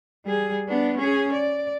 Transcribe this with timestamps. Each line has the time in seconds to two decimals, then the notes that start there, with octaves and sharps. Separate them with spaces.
0.25 G3 G#4
0.68 B3 D4
0.98 C#4 G#4
1.33 D5